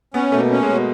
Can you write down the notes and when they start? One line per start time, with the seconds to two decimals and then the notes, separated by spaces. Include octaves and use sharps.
0.14 B3 C#4
0.32 B2 A3
0.38 A#3
0.51 C#4
0.63 G#3
0.69 B2